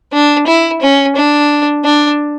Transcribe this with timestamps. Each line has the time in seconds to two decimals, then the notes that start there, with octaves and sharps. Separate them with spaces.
0.13 D4
0.47 E4
0.81 C#4
1.16 D4
1.84 D4